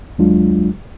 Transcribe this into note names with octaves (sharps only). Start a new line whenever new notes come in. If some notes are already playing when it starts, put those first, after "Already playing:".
D#2 F#3 G#3 D4 F4